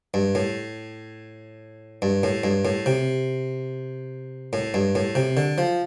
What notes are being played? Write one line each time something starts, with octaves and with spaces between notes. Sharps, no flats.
G2
A2
G2
A2
G2
A2
C3
A2
G2
A2
C3
D3
F3